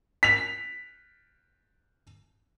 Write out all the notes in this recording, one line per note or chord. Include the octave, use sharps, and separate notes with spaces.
B6 F7